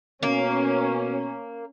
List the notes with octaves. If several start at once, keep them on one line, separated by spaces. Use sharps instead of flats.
B2 A#3 C#4